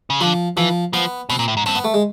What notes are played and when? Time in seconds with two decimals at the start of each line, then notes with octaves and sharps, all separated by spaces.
0.10 C#3
0.21 D3 F3
0.57 E3 F3
0.93 F3 B3
1.30 B2 C4
1.39 A#2
1.48 A2
1.57 G#2
1.66 G2 C4
1.75 B3
1.84 A3
1.94 G#3